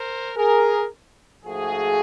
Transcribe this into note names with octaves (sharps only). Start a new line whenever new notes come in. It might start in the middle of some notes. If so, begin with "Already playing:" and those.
Already playing: A#4 C5
G#4 A#4
G#2 F3 A3 F#4 G#4